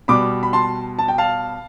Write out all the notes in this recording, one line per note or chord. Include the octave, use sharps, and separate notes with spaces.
B2 G3 B5 D6
B5
A5 C6
A5
G5
F5 A5